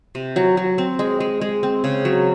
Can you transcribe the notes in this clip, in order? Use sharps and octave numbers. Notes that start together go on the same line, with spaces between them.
C3
F#3
F#3
C4
G#3
G#3
G#3
C4
C#3
F#3